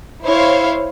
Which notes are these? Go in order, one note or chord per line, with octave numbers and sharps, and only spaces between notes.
E4 C5 C#5 F5